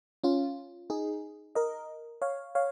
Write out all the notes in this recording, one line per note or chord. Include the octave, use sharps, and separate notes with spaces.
C#4 F4
D#4 G#4
A#4 D#5
C#5 F5
C#5 F5